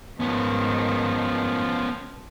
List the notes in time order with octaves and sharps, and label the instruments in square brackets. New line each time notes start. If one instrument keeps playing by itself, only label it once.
[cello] G#2 D#3 [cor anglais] F3 [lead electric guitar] B3 C#4